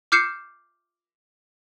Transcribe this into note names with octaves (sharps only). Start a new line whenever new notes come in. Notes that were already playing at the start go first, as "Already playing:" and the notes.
D6 F6 G6 C7 C#7 E7